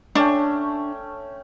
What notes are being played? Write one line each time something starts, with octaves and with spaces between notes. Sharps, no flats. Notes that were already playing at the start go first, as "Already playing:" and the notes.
A3 C#4 D4 G5